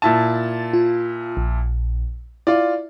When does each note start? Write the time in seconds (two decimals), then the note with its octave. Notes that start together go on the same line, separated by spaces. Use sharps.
0.02 A#2 E4 A5 A6
0.73 F4
1.37 A#1
2.47 E4 F4 D5